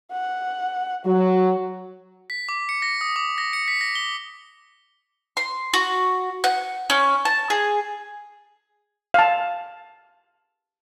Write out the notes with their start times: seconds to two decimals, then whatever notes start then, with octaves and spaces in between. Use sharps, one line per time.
0.12 F#5
1.05 F#3 F#4
2.30 B6
2.49 D6
2.69 C#7
2.82 A#6
3.01 D#6
3.16 D6
3.38 A#6
3.53 C#7
3.68 B6
3.81 A#6
3.95 G7
5.37 C6
5.74 F#4
6.44 F#5
6.90 C#4
7.25 A5
7.50 G#4
9.14 F5 A5